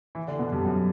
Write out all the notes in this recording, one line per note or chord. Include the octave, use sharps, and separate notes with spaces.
E3 E4
D3 D4
B2 B3
G2 G3
F#2 F#3